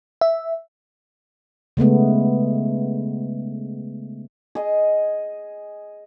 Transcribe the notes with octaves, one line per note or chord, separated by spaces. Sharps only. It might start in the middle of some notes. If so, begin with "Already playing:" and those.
E5
C#3 G#3 A3 B3
G#4 D#5